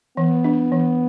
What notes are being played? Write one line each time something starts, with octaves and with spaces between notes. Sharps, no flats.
E3 B3
D4
E3